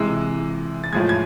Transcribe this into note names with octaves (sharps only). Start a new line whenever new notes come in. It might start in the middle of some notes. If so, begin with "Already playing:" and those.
Already playing: C3 E3 G#3 E6
A6
A2 F3 G#3 G#6
G#6